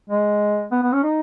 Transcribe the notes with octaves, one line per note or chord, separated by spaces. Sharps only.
G#3
B3
B3
C#4
D#4